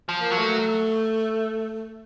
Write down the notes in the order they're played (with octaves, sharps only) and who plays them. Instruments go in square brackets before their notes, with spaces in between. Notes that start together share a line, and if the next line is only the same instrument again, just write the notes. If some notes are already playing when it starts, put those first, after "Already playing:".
[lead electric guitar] F3
[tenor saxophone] A#3
[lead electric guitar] F#3
[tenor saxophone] A3